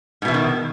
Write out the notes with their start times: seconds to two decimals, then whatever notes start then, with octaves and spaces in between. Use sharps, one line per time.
0.22 G#2
0.25 B2
0.28 E3
0.31 E2
0.34 D#3